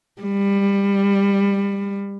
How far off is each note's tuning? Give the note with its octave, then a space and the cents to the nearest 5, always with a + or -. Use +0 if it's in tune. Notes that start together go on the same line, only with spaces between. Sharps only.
G3 +25